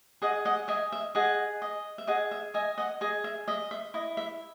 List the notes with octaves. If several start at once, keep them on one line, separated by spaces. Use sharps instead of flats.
G#4 D#5 F#5
D#5 F#5
D#5 E5 G#5
E5
G#4 D#5 F#5
D#5
E5
G#4 D#5 F#5
E5
D#5 E5 G#5
D#5 F#5
G#4 D#5
E5
D#5 E5
E5
E4 D#5
E5